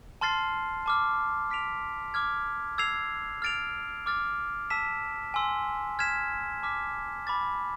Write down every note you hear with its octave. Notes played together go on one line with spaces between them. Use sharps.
A5 C6 F6 A6 C7
A5 D6 F6
F6 B6 D7 F7
D6 F6 G#6
E6 G#6 C7 F7
F6 A6 D7 F7
D6 F6 A6
A5 E6 B6 E7
G#5 C6 E6
F6 G#6 B6 E7
A5 D6 F6 B6
B5 D6 A6